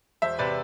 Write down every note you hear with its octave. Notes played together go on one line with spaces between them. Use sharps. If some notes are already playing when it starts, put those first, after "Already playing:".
E1 C5 E5
C3 B4 D5